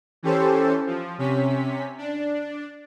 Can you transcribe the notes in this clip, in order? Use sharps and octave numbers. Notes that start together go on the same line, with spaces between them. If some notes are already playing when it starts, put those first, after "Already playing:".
E3 C#4 G4 A4 C5
F3
C3 C#4 B6
D4